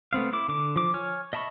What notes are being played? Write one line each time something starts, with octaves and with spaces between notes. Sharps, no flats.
A3 B3 C4 F5
E4 D6
D3 D6
F3 D6
C#5 G#5 F6
D#5 E5 A5 B5 C#6